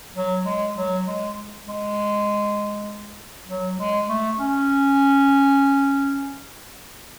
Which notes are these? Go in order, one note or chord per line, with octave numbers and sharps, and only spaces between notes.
F#3
G#3
F#3
G#3
G#3
F#3
G#3
A3
C#4